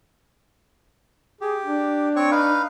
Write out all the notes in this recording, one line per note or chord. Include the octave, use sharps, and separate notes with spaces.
G4 G#4
D4
C4 C#5 C#6
D#4 B4 F5